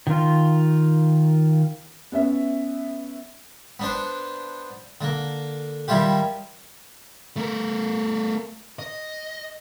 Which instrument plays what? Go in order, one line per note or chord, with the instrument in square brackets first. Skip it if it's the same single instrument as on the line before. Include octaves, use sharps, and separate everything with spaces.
[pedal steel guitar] D#3 F4
[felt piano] B3 C#4 E5
[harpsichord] B3 D4 C5
D3 A#3
D#3 G3 E4 F4 G4
[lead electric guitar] A3 A#4
D#5